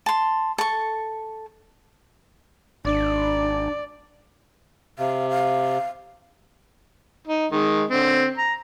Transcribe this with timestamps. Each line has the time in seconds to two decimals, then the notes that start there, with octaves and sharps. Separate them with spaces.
0.06 A5 C6
0.58 A4 C#6
2.85 G#1 D4 D5
4.99 C3 F5
5.29 F5
7.27 D#4
7.52 D#3 G#3
7.90 D3 C4
8.38 A#5